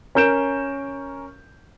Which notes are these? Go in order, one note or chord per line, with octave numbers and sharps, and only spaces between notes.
C#4 A#4 G6 D7 E7